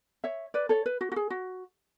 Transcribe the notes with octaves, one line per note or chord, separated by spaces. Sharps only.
C#5 E5
B4 D5
A4 C#5
B4
F#4
F#4
G#4
F#4